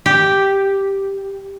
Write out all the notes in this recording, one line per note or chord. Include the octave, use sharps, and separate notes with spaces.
G4